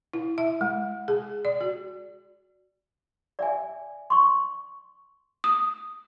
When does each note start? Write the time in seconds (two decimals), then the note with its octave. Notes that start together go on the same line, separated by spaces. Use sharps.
0.13 E4
0.38 E5
0.61 G#3
1.08 G#4
1.45 D5
1.61 F#4
3.39 D5 E5 G#5
4.10 C6 C#6
5.44 D#6